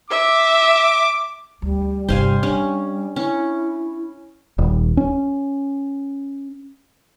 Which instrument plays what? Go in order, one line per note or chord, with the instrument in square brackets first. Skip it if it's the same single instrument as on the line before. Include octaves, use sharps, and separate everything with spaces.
[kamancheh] E5 [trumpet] D6
[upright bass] D2 [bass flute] G3
[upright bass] G1 C3 [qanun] C5 F5 G#5
[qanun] C#4 [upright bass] D4
[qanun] C#4 [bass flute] E4
[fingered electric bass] D#1
C#4